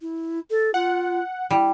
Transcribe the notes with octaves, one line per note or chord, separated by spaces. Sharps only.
E4
A4
F4 F#5
G3 E4